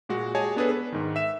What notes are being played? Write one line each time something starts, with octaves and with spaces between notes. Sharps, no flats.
A#2 G#3 F#4
G4 G#4 C#5 D#5 G#5 A5
B3 D4 G#4 A4 B4
B4
G#2 D#3
E5 E7